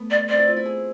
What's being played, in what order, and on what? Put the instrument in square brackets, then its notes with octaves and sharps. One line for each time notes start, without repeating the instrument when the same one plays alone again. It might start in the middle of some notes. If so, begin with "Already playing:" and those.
Already playing: [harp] A3 B3
[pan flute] D5
[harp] C4 [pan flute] D5
[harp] E4
F4
E4
G#4